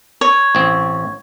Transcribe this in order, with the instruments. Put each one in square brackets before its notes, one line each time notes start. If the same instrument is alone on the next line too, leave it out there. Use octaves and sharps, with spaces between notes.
[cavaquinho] C#5
[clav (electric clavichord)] A1 C4